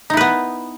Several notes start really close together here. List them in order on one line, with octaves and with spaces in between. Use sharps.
D#4 E4 B4 B3